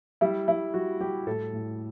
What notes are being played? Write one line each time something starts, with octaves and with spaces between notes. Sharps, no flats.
G3 E4
G3 E4
G3 F#4
G3 G4
A2 A4
A2